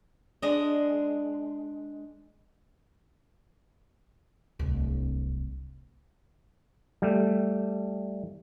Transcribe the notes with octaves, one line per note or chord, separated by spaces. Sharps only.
G#3 D4 D#5
D1 C2
G3 A3